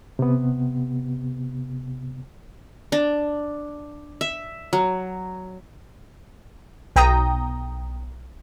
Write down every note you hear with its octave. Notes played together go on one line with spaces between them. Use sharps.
C3 B3
D4
E5
F#3
B1 G5 A#5 D#6